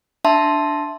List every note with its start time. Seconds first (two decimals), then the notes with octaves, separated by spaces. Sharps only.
0.24 D4 E5 A5 C6